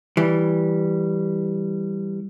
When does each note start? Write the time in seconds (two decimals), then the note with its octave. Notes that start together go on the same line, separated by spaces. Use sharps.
0.17 E3 G3